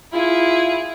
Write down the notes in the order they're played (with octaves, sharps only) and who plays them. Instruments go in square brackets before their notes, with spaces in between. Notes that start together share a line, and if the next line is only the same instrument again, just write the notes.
[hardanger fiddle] E4 G#4 [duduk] F4